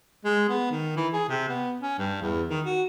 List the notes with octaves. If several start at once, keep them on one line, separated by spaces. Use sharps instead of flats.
G#3
B3
D#3
E3
G#4
C3
B3
C#4
G2
E2
D#3
F#4